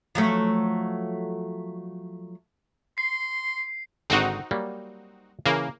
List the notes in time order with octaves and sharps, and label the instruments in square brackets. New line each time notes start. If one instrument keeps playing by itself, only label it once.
[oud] F3 F#3 A3
[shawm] C6 [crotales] C7
[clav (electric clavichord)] G#1 D3 [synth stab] C4 D#4 F#4
[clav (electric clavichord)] F#3 G3 A#3
[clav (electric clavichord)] C#3 E3 [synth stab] A#3